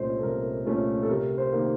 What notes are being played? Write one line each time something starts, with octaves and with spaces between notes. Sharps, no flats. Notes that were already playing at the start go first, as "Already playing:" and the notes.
Already playing: C2 A#2 A3 C#4 C5 C#5 D#5
A4
C2 A#4
A#2 A3 C#4 A4
A4
C3 A#4
C5
D#3 A#3